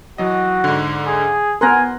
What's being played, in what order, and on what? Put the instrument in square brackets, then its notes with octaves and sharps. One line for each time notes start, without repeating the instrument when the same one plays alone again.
[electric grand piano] E3 F#3 D#5 [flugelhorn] F#4
[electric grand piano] G#2 D3
[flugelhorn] G#4
[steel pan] B3 A#4 [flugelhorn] G#5 [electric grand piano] C6 F#6 A#6